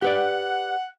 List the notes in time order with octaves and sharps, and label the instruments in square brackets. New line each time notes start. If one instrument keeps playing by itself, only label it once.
[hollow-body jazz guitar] G4 B4 D5 [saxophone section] F#5